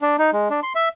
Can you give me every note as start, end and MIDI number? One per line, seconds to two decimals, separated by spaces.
0.02 0.16 62
0.19 0.31 63
0.33 0.49 56
0.50 0.60 62
0.63 0.73 84
0.75 0.89 76